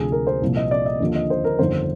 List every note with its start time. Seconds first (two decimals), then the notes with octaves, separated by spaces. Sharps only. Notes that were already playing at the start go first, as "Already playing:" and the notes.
Already playing: D2 C3 F3 G#4
0.12 A#4
0.27 C5
0.42 C2 A#2 F3
0.57 D#5
0.71 D5
0.86 D#5
1.00 D#2 D3 F3
1.15 D#5
1.30 C5
1.44 A#4
1.59 G1 F2 D#3 C5